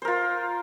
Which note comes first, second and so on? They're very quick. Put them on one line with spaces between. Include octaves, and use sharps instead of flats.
C5 A#4 F4